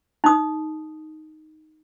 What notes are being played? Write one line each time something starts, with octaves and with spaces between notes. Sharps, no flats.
D#4 D#6